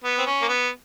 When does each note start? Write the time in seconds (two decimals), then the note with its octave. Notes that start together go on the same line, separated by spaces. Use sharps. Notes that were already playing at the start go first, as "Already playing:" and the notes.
0.04 B3
0.18 C4
0.26 C#4
0.42 A#3
0.48 B3